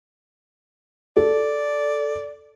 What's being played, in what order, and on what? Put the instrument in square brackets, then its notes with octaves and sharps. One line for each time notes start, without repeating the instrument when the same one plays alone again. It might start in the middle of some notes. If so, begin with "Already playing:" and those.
[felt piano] A4 [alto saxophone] D5